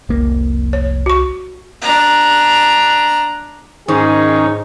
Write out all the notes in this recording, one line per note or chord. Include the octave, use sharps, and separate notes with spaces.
F1 C2 A#3
C#5
F#4 C#6
D4 A#5
G#2 D#3 C#4 D#4 G#4